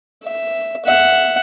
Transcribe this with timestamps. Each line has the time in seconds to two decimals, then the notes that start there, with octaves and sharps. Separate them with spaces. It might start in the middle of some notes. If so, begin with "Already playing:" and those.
0.25 E5
0.85 E5 F#5